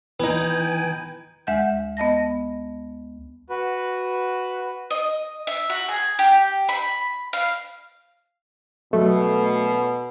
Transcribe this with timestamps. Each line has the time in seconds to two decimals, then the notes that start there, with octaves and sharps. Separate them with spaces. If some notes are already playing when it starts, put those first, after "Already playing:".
0.20 E3 B3 D#4 G5 G#5
1.47 D2 G#3 E5 F#5 G6
1.97 B3 D#5 A5 A#6
3.50 F#4 B4
4.90 D#5
5.47 E5
5.70 F#4
5.88 G#4
6.19 G4
6.69 B5
7.33 F5
8.93 B2 F#3 A3 C#4